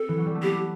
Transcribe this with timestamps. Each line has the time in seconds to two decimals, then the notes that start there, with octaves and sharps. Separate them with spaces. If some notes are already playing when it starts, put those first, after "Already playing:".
Already playing: C4 A4
0.09 E3
0.18 F#3
0.26 G3
0.35 A3
0.43 B3 G4